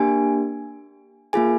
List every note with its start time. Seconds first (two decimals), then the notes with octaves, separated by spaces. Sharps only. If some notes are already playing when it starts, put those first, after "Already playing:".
Already playing: A#3 D4 G4 G#5
1.33 A#3 F4 G#4 G#5